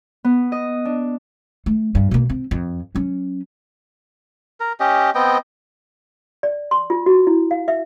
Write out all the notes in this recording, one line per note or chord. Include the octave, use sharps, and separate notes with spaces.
B3
D#5
D4
A3
G2
B2 A#3
C4
F2
F#3 C#4
A#4
C#4 G4 D#5
B3 C4 D#5 G5
D5
C6
F4
F#4
E4
F5
E5